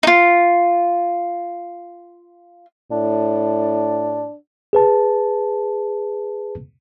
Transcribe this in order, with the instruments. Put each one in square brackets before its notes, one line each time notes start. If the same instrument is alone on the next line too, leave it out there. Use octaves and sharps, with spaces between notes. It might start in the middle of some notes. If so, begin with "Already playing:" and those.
[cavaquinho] D#4 F4
[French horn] A2 [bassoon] D4
[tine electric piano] G#4 B4 A5